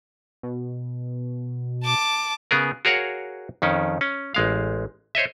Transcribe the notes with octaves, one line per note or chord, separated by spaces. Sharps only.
B2
A5 D6
C#3 B3 G#4 A#4
F#4 G#4 A#4 C#5 F5 F#5
F2 D#3 C#4
C#4
A1 G#3 F5
C5 C#5 D#5 E5